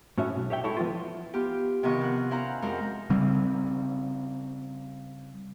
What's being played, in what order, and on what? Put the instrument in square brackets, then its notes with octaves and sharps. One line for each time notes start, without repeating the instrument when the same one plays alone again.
[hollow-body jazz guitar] A2 C#4 F#4 E5
B1
G4 C#5 E5 G5
G#3 E4 F#4 A4 C#5 A5
F3 B3 F4
[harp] B3 F4 G4
C3 D#3 F3 B3 D#5 C#6
F4 F#5
C#4 E4 C5 F5 F#5 A#5
F2 G#3 F#4 A#4 C5
[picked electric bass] C#3 G3 C4